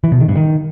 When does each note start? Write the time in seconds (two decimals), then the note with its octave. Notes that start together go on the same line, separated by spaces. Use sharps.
0.04 E3
0.12 B2
0.20 D#3
0.28 G2
0.37 D#3